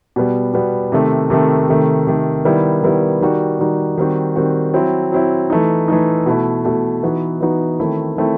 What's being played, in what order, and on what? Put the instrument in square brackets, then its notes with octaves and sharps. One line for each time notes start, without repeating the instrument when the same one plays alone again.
[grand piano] B2 G3 B3
B2 G3 B3
C3 D#3 A3
C3 D#3 A3
C3 D#3 A3
C3 D#3 A3
D#3 G3 B3 E4
D#3 G3 B3 E4
D#3 G3 D#4 F#4
D#3 G3 D#4 F#4
D#3 G3 C4 F#4
D#3 G3 C4 F#4
F#3 C4 E4
F#3 C4 E4
E3 A3 D#4
E3 A3 D#4
B2 A3 E4
B2 A3 E4
E3 B3 D#4 F#4
E3 B3 D#4 F#4
D#3 A3 C4 E4
D#3 A3 C4 E4